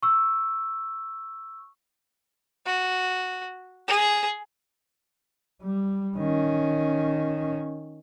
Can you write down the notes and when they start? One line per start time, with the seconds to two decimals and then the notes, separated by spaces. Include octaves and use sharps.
0.03 C#6 E6
2.66 F#4
3.87 G#4
5.63 G3
6.17 D#3 C#4